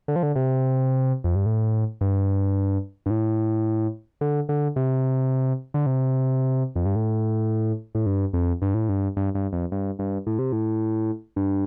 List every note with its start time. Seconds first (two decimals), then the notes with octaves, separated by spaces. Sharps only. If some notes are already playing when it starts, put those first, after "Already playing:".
0.08 D3
0.16 F3
0.23 D3
0.36 C3
1.24 F2
1.35 G2
1.46 A2
2.01 G2
3.06 G2
3.10 A2
4.21 D3
4.49 D3
4.76 C3
5.74 D3
5.86 C3
6.76 F2
6.86 G2
6.96 A2
7.95 A2
8.06 G2
8.33 F2
8.62 G2
8.74 A2
8.89 G2
9.17 G2
9.35 G2
9.53 F2
9.72 G2
9.99 G2
10.27 A2
10.39 C3
10.52 A2
11.36 G2